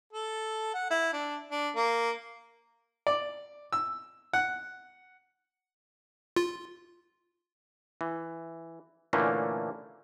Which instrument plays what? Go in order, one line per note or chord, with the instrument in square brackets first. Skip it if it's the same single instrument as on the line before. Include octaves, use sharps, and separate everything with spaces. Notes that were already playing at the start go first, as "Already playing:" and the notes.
[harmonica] A4
F#5
E4
D4
D4
A#3
[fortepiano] D5
E6
F#5
[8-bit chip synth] F4
[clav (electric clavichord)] E3
A#2 D3 E3 A3 A#3 C#4